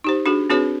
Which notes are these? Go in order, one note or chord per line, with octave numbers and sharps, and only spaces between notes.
D#4 G4 C5
D4 F#4 G#4
C4 D4 F#4 G#4 B4 C#5